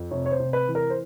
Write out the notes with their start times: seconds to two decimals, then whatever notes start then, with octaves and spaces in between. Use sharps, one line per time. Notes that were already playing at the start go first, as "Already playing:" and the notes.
Already playing: F2
0.11 C3 C#5
0.26 C#5
0.32 C5
0.40 C3
0.53 B4
0.68 E3
0.75 A#4
0.90 C5